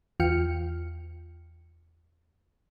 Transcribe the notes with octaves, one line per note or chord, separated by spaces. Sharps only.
E2 F4 G5 F6 C#7